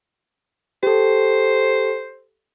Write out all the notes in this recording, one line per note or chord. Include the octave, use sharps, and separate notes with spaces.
G4 A4 C5